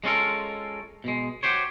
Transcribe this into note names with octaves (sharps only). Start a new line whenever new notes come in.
G#3 B3 C#4 F4 A4 A#4
B2 G#3
F#4 G4 C5 C#5